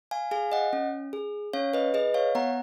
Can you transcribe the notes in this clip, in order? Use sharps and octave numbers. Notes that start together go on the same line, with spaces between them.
F5 G#5
G#4 F5 G#5
D#5 F#5
C#4
G#4
C#4 C#5 F5
B4 D#5
G#4 B4 D#5
C#5 F5
B3 F#5 A#5